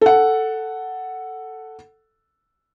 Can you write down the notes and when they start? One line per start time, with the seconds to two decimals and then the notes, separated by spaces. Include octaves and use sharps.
0.01 A4 F#5